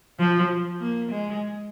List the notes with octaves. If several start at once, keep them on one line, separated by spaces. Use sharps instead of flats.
F3
A#3
G#3